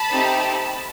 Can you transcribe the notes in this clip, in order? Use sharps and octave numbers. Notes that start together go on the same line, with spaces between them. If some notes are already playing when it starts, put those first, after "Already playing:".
Already playing: A5 B5
A3 C4 D#4 G4